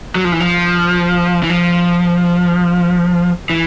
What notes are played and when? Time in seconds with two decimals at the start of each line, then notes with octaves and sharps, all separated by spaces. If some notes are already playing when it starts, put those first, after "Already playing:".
0.16 F#3
0.24 F3
0.32 E3
0.40 F3
1.43 E3
1.50 F3
3.50 E3